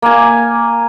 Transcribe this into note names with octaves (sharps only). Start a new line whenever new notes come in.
A#3 G#5